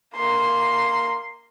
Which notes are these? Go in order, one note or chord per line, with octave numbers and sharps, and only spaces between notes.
A#3 C6